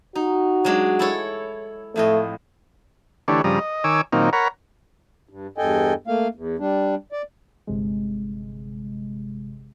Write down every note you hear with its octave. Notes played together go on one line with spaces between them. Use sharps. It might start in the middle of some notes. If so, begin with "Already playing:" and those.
D#4 F#4
F#3 G#3 D4
E4 A4 C#5
F2 A2 A3 D#5
D3 E3 A3 D4 G4 C#5
G2 C#3 F3 G3 A#5 D#6
D#5
D#3 C#5 G#5 D6 E6
A#2 D#3 F#3 A#3 C4 D#4
A#4 C#5 F#5 A#5 B5
G2
E2 G2 A4 D#5 G5 G#5
A3 A#3 F5
E2
G3 D4
D5
G1 C3 G#3